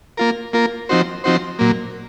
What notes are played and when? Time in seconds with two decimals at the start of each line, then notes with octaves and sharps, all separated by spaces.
0.17 A#3 F4 A#4
0.53 A#3 F4 A#4
0.89 F3 C4 D#4 F#4 C5
1.24 F3 C4 D#4 F#4 C5
1.59 A#2 F#3 A#3